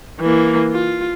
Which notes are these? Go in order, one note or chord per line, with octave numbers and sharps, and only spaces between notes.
E3 A#3
F4